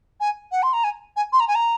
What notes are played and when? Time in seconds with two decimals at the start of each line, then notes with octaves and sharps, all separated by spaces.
0.20 G#5
0.52 F#5
0.63 C6
0.73 A#5
0.84 G#5
1.16 G#5
1.33 C6
1.40 A#5
1.48 G#5
1.55 A#5